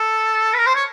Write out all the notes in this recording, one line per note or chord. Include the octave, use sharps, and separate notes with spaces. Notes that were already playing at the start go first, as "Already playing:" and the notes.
Already playing: A4
B4
A#4
C5
C#5